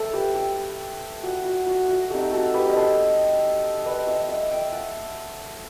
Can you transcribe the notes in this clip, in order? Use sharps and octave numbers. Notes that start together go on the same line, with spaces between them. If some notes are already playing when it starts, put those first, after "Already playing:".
Already playing: A4 E5 G5
G4 B4
G4
F#4
F#4
F#4
F#4
A3 C4 D#4 G4
F#4 A4
G4 B4
D#5
A4 C5
B4 D#5
C5 E5
D#5 F#5
E5 G5
F#5 A5